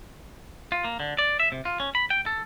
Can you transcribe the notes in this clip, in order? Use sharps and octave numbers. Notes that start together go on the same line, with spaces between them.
F4
A#3
D3
D5
E5
C3
F4
C#4
B5
G5
A4